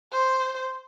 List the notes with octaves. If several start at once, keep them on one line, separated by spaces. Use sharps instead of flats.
C5